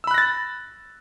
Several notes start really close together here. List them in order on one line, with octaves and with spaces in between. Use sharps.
E6 B5 F#6 A#6 A6